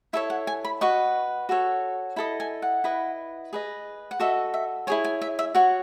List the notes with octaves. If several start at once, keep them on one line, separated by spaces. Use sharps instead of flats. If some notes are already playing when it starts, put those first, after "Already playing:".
E4 A4 C#5 E5
F#5
G#5
B5
F#4 B4 D#5 C#6
F#4 A4 C#5
E4 A4 D#5 B5
G#5
F#5
E4 B4 D#5
G#4 B4 D#5
F#5
F#4 A4 D#5 E5
E5
E4 G#4 C#5 G#5
G#5
E5
E5
F#4 C#5 F#5